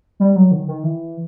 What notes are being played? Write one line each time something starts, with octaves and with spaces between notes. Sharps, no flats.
G3
F#3
D#3
D#3
E3